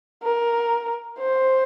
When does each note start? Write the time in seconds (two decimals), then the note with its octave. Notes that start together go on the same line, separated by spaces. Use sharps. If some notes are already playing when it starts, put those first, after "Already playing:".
0.23 A#4
1.18 C5